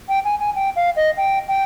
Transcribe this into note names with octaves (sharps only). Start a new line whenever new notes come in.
G5
G#5
G#5
G5
F5
D#5
G5
G5